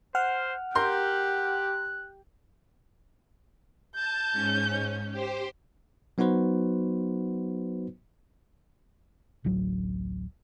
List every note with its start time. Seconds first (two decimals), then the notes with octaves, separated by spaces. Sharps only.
0.15 C5 F#5 F6
0.75 G4 A#4 C6 F#6 G6
3.95 A5 G6
4.33 G#2 C#4
5.12 G4 C5
6.18 F#3 B3 D#4 F#4 B4 C5
9.44 D1 A1 F#3